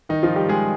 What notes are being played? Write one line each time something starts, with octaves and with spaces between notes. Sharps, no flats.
D#3 D#4
F3 F4
G3 G4
G#3 G#4